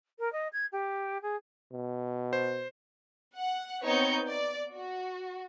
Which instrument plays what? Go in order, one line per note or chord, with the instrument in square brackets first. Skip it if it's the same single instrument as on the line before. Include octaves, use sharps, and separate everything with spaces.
[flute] A#4
D#5
G#6
G4
G#4
[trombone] B2
[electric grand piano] C5
[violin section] F#5
B3 C4 D#4 C#5 G6 C#7
D5
F#4